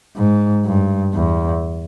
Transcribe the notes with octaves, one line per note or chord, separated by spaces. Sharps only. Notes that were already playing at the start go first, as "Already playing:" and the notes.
G#2
G2
E2